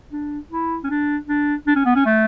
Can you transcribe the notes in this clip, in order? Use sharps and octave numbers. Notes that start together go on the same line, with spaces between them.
D4
E4
C#4
D4
D4
D4
C#4
B3
C#4
A3